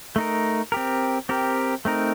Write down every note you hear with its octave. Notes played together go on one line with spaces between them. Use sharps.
A3 D#4 A#4
C4 G4 A#4
C4 G4 A#4
A3 C4 D#4 A#4